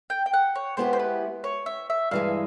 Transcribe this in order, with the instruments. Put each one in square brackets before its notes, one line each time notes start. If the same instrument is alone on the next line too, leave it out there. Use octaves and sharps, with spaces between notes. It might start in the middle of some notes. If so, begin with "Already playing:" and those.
[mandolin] G5
G5
F#5
C#5
[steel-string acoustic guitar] G#3 B3 E4 G4 A#4 [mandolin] C5
[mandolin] C5
B4
C#5
E5
E5
[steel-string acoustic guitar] G2 E3 G#3 [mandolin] F5